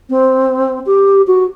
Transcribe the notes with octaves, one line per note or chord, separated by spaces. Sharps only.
C4
G4
F#4